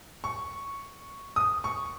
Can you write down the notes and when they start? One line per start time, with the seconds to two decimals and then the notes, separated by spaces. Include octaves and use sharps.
0.24 C#6
1.36 D#6
1.64 C#6